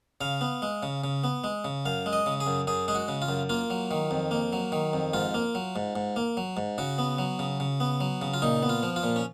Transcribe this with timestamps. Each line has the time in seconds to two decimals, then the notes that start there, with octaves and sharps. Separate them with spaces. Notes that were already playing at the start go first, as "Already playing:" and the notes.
0.21 C#3 F5
0.41 B3
0.62 G#3
0.83 C#3
1.04 C#3
1.24 B3
1.44 G#3
1.65 C#3
1.86 F#2 F5
2.06 G#3
2.13 D#5
2.26 C#3
2.40 G#4
2.47 F#2
2.67 F#2 G#4
2.88 G#3 G#4
2.95 F#4
3.08 C#3
3.22 F4
3.29 F#2
3.49 A#3 F4
3.70 F#3
3.91 D#3
4.11 F2
4.31 A#3
4.53 F#3
4.72 D#3
4.93 F2
5.13 G#2 F4
5.34 A#3
5.55 F#3
5.76 G#2
5.96 G#2
6.16 A#3
6.37 F#3
6.57 G#2
6.78 C#3 F#4
6.98 B3
7.18 F#3
7.39 C#3
7.60 C#3
7.80 B3
8.01 F#3
8.22 C#3
8.34 F4
8.42 A#2 D#4
8.63 B3
8.69 F4
8.83 F3
8.96 F4
9.03 A#2
9.16 C#4